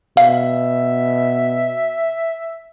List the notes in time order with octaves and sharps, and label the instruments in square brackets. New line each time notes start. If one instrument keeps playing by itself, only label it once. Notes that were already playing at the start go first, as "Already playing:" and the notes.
[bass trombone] B2 [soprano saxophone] E5 [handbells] F5